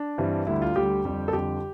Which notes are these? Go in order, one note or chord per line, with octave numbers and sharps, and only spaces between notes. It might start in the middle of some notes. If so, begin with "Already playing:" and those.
Already playing: D4
G2 E3 G3 C4
D2 D3 G3 E4
F4
D2 D3 G3 G4
F2 D3 G3
A4
F2 D3 G3 G4